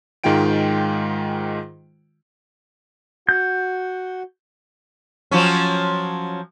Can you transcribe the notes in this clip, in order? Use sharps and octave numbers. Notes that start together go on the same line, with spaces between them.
G#2 D#3 G#3 F4 G5 D7
F#4 F#5 G6
F3 F#3 C#4